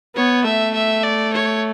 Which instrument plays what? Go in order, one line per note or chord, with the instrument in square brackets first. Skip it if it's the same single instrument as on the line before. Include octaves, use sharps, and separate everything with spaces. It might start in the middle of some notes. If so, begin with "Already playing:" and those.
[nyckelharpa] B3 [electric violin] C#5
[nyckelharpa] A3 [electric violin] E5
[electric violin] E5
D5
C#5